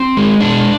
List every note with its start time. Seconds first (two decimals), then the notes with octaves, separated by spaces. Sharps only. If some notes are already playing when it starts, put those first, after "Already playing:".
Already playing: C4
0.17 G#3
0.40 B2 D4